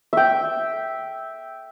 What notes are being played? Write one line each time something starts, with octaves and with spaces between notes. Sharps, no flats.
E5 G5